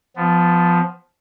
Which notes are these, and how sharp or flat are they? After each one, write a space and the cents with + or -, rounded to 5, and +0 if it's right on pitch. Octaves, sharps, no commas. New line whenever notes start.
F3 +0 B3 +25